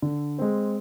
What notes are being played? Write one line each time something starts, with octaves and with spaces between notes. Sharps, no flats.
D3
G#3 C4